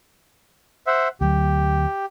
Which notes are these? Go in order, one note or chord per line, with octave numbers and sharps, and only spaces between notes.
C5 E5 F#5
D2 F#3 G4